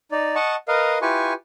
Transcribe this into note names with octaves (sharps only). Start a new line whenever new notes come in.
D#4 D5
D#5 F#5 A5 C#6
A#4 B4 D#5 F5
E4 F4 G4 B4 G#5 C#6